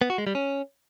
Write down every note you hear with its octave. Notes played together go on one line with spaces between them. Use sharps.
B3
F#4
G#3
G3
C#4